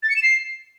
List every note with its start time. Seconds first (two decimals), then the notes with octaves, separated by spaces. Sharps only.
0.03 A6
0.10 C#7
0.16 E7
0.23 C7